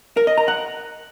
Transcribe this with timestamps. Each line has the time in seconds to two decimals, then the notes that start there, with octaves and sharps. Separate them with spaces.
0.17 A#4
0.27 D#5
0.38 A#5
0.48 F#5